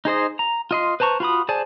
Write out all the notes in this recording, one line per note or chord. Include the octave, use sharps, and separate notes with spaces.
D#4 G#4 C5 D#5
A#5
F4 D#5 C6
B4 C5 A5 A#5 C#6
F4 F#4 B5 D#6
G#4 C5 D5 G#5 A5